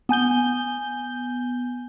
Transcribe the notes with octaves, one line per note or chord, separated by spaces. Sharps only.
B3 G#5 G6 G7